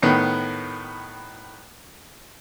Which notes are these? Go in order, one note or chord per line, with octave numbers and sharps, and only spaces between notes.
A2 D#3 B3